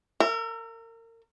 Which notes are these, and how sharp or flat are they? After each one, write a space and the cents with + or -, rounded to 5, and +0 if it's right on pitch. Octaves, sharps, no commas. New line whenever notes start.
A#4 -30 E5 +20